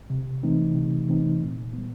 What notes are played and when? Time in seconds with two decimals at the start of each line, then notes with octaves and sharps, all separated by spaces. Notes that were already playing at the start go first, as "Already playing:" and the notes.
0.10 C3
0.43 E3 A3 C4 D#4
0.75 C3
1.08 E3 A3 C4 D#4
1.41 A#2
1.73 G3 B3